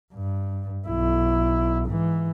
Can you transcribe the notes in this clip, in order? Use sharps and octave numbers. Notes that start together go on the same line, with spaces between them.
G2
B1 E4
G#2 E3